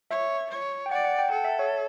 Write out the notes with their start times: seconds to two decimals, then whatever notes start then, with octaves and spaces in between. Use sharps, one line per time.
0.11 C#5 E5
0.51 C#5
0.86 G5
0.91 D5 F#5
1.05 F#5
1.19 G5
1.32 A4 F#5
1.45 E5
1.59 C#5